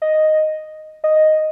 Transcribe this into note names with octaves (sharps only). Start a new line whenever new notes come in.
D#5
D#5